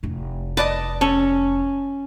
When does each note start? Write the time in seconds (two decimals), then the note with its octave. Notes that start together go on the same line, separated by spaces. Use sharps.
0.03 F1 E4
0.57 B4 D5 D#5 A5
1.01 C#4 A4